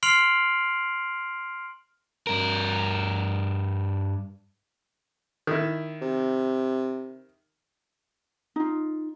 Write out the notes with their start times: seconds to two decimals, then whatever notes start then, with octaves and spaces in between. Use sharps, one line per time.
0.03 C6 F6 C7 D7 F7 F#7
2.27 G2 A#4
5.47 D#3 E4
6.02 C3
8.56 D#4 F4